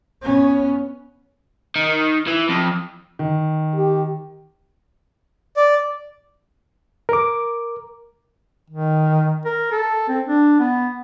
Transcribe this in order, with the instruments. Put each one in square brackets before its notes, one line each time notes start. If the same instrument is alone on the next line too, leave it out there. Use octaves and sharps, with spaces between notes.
[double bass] B3 C#4
[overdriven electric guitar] D#3
E3
F2
[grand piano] D#3
[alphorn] G4
[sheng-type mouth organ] D5
[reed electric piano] A#4 D6
[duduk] D#3
A#4
A4
C4
D4
B3